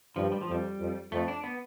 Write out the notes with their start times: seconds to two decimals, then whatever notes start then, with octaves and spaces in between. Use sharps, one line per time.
0.16 G2 F3
0.32 G3
0.41 F3
0.49 F2 G3
0.79 F2
1.12 F2 A3
1.28 D4
1.44 B3